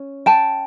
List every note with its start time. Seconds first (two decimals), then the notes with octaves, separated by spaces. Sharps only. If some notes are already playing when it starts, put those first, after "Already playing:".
Already playing: C#4
0.26 G5 A5